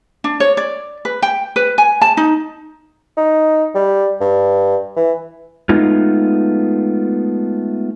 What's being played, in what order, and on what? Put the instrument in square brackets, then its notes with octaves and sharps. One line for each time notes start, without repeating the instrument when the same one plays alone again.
[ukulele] D4
C#5
D5
B4
G5
B4
G#5
A5
D#4
[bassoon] D#4
G3
G2
E3
[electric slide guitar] G#3 A3 B3 D#4 F4